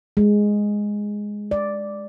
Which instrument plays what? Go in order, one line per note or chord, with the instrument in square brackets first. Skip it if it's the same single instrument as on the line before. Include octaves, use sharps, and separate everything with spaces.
[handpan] G#3
D5